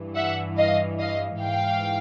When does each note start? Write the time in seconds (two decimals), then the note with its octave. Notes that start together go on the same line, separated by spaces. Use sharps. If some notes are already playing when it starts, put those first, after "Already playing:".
Already playing: G2 E3
0.15 E5 F#5
0.57 D#5 F5
1.00 D#5 F5
1.41 G#2 E3 F5 G5